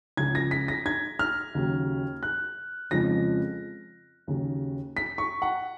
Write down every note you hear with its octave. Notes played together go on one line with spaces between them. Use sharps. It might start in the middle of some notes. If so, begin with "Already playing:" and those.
C#2 C#3 F3 G#6
A#6
B6
A#6
G#6
F6
D#2 C#3 F#3
F#6
F2 C#3 F3 G#3 A#6
D#2 C#3 F#3
B6
C#6
F#5